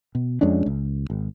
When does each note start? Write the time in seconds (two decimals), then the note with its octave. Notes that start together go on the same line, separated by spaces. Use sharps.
0.15 B2
0.41 F2 G#3 C#4 D4
0.66 C#2
1.10 G#1